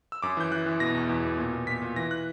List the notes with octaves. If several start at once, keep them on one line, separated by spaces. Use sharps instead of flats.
E6
F#2 D6
E3 G6
E3 F#6
E3
B2 A#6
E2
E2
B2
A#2
A#2
A#2 B6
A#2
E3 A#6
F#6